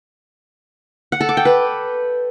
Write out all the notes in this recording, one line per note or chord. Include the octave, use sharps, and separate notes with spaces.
F#5
A4
D6
G5
B4